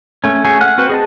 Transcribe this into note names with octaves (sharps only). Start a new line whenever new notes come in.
A3 C#4
A3 C#4 F#4 G#4
F#5 F6 F#6
C4 F#4 B4 C5
G#4 D#5 A5